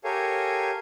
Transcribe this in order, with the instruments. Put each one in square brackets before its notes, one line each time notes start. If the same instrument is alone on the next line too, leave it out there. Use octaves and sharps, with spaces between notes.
[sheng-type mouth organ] G4 A4 A#4 C#5 F5 G#5